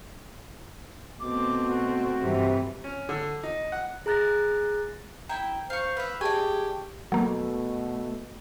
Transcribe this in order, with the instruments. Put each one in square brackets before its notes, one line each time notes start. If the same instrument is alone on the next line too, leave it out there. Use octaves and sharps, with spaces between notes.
[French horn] B2 [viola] A3 C4 [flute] D6
[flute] F#4
[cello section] G2 E3 [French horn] C3
[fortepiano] C#4
D3
D#4
F#5
[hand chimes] G#4 A#5 F#6 A6 A#6
[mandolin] E4 G5 [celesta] A#5
[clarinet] C5 [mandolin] F5 C#6
[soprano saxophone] B4 [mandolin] E5 F5
[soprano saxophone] G4 [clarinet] G#4 [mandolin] D5 G#5 [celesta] E5 A5 C#6
[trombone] B2 [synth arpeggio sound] F#3 A#3 [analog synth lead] A3